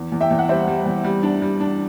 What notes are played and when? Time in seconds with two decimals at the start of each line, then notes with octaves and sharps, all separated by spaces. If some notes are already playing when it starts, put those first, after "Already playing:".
Already playing: E2
0.12 E2
0.21 E5 G5
0.31 E2
0.39 F#5
0.49 G3 C5 E5
0.68 G3
0.86 E2
1.04 G3
1.23 D4
1.42 G3
1.60 D4